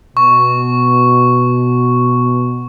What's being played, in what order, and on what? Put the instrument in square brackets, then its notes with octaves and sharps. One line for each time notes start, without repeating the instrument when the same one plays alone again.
[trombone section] B2 [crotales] C#6